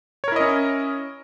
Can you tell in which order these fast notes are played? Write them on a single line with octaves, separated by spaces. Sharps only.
C#5 A#4 E4 D#5 C#4